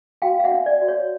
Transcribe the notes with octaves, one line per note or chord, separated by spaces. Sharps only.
F#4 F5 G5
F5
E5 F#5
D4
D5
F#4
C#5